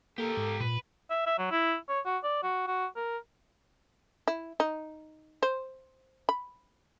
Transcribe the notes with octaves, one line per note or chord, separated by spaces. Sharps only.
A#3 G4 A4 A#4
G#2
A#2 B4
E5
E5
F#3
E4
C#5
F#4
D5
F#4
F#4
A#4
E4
D#4
C5
B5